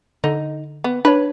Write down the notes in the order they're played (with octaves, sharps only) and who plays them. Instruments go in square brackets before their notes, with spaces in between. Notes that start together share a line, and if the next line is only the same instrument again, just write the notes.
[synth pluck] D3 [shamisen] D#4
[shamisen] B3
[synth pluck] D4 C#5 [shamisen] B4